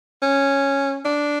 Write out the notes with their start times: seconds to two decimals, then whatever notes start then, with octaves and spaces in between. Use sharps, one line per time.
0.22 C#4
1.05 D4